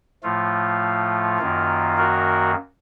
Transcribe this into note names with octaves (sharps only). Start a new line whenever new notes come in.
A2 F3 A3 F4
F#2 D#3 A#3
F#4 A#4